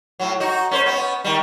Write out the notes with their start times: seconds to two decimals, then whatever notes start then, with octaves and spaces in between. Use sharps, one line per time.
0.20 A2 F#3
0.40 D#4 F#4
0.71 C#4 B4 C5
0.86 B3 C#4
1.24 D#3 G3